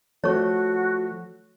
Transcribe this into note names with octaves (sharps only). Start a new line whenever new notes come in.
F3 A3 F#4 C#5 C#6